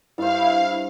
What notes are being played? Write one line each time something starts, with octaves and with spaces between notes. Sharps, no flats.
G2 E4 C5 F5